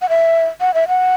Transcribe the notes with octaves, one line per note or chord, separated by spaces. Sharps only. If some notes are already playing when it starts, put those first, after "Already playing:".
F#5
E5
F#5
E5
F#5